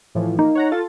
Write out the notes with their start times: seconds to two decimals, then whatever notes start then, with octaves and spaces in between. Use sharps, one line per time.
0.15 A2 E3 F3
0.39 A#3 D#4
0.55 C#5 F#5 A#5
0.72 F4 A4 A6